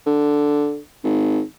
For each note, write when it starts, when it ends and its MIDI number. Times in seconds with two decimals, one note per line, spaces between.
0.06 0.79 50
1.04 1.41 32